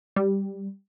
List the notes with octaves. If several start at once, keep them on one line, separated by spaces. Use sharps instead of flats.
G3